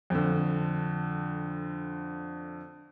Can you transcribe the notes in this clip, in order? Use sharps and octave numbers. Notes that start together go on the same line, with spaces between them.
F2 D3